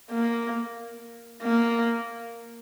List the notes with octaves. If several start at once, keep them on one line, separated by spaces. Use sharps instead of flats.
A#3
A#3